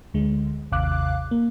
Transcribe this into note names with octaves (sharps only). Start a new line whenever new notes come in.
D2 D3 G#3
G#1 D#2 C3 F5 D6 F#6
A#3